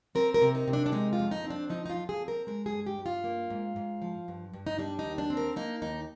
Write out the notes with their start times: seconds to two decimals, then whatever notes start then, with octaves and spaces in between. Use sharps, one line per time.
0.15 C4 A#4
0.34 A#4
0.42 C3
0.55 D#4
0.68 C3
0.73 D4
0.86 D4
0.92 G#3 D#4
1.13 F4
1.19 F2
1.31 D#4
1.44 C4
1.50 D4
1.69 F3 D#4
1.86 D#4
1.90 F4
1.96 F2
2.09 G#4
2.22 C4
2.28 A#4
2.47 G#3 A#4
2.66 G#4
2.72 G2
2.86 G4
2.98 G2
3.06 F4
3.24 A#3
3.50 G#2
3.76 G#2
4.02 F3
4.28 G2
4.53 G2
4.67 D#4
4.78 G3 D4
4.99 D#4
5.05 D#2
5.18 D4
5.30 C4
5.37 A#4
5.56 A#3 D#4
5.82 D#2 D#4